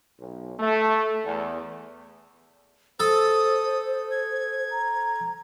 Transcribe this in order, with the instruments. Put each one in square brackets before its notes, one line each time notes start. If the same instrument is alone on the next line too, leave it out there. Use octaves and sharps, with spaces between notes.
[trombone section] B1
A3
E2
[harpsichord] A4 [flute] C5 [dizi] D#6
[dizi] G#6
[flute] A#5